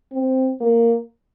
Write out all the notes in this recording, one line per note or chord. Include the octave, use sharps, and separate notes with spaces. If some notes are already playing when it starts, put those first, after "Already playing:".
C4
A#3